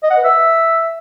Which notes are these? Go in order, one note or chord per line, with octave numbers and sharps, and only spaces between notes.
D#5
F#5
B4
E5